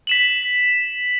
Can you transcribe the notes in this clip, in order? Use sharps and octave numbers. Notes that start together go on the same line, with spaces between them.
B6 E7 F#7